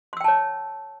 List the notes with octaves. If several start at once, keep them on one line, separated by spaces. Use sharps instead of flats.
C#5 G5 A5 C6 E6